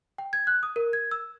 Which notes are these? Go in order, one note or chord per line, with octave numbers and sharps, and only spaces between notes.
G5
G#6
F#6
D#6
A#4
G#6
E6